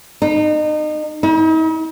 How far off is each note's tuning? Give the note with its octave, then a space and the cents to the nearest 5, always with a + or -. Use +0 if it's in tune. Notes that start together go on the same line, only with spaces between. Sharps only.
D#4 -30
D#4 +45